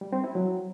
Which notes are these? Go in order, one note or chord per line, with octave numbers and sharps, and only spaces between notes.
G3
C4
E4
F#3